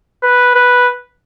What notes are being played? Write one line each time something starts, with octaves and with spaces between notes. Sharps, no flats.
B4
B4